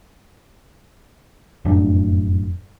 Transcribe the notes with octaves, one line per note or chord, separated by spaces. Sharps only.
F1 F#2 A2 D4